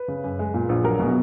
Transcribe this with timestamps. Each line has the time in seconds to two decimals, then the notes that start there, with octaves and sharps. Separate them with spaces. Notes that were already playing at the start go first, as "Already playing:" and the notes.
Already playing: B4
0.08 C#3
0.24 F#2
0.39 G#3
0.54 A#2
0.69 A#1
0.84 F#3 A#4
1.00 B2 G#4
1.07 F#4